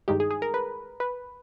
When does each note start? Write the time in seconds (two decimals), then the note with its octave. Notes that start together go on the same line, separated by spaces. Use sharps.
0.08 G2 D#3 G#3 G4
0.20 G#4
0.31 G#4
0.42 A#4
0.54 B4
1.00 B4